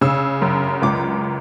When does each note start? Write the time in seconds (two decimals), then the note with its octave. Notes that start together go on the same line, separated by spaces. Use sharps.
0.01 C#3 E6
0.42 F#2
0.82 C#2 D6